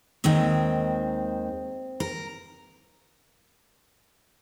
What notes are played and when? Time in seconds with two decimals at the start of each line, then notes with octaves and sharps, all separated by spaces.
0.24 D#2 D#3 G#3 C4
2.00 A#4